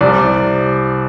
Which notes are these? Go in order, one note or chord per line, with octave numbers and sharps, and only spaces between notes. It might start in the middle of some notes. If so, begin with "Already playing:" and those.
C2 C3 G3 D5